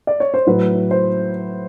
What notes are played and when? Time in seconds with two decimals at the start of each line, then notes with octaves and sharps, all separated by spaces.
0.07 D5
0.20 C#5
0.34 C5
0.47 A2 F#3 B4
0.91 C5